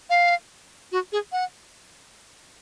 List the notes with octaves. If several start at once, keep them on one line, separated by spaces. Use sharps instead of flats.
F5
F#4
G#4
F#5